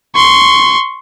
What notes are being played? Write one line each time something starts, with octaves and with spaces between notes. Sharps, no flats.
C6 C#6